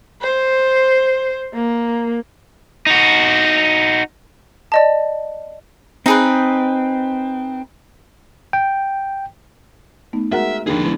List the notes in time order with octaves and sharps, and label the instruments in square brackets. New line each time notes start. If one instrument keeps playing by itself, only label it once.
[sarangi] C5
A#3
[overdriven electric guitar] D#4 F#4
[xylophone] D5 D#5 A5
[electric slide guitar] C4 [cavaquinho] D#4 G#4 B4
[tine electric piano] G5
[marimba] A3 B3 D#4
[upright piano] G#3 A#4 F#5 [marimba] F#4 [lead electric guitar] E5
[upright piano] D#2 D3 D#3 [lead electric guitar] D4 G#4
[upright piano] D3 G#3 B3 [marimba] E4